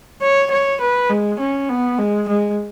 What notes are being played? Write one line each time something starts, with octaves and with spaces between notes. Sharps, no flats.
C#5
C#5
B4
G#3
C#4
B3
G#3
G#3